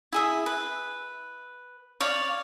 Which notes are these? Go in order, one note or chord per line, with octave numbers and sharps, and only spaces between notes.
E4 G#4 E5
B4
C#5 D5 F5